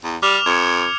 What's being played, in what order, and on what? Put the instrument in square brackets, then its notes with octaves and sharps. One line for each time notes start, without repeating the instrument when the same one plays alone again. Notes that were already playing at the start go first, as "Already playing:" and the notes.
[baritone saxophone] E2
[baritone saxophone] G3 [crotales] D6 F6 F7
[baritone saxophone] F2 [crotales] G#6 C#7